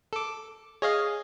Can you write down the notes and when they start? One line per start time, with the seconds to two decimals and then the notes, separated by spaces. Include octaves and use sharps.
0.13 A4 D6
0.82 G#4 C#5 D#5 F5